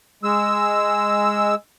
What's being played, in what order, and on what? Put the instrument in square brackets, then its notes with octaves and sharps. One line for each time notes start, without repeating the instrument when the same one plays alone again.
[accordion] G#3 E6